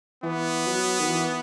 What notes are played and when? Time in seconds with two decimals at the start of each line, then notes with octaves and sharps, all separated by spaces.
0.23 E3 B3
0.66 F#3
1.00 D#3
1.08 E3